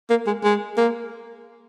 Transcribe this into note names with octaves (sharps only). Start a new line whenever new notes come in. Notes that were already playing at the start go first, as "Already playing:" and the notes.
A#3
G#3
G#3
A#3